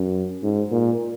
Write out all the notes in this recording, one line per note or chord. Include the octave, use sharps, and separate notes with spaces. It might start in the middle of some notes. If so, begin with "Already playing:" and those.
Already playing: F#2
G#2
A#2